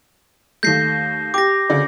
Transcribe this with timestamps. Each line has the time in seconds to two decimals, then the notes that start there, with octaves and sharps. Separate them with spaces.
0.63 D#2 A3 G6 A#6 C7
1.34 G4 D6 A#6
1.69 D2 C#3 D5